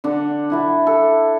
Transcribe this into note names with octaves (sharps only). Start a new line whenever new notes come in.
D3 D4 A4 F#5
D4 E4 F#5
A4